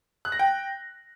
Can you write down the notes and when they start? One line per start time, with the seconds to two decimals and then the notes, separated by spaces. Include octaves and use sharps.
0.25 F#6
0.32 A#6
0.39 G5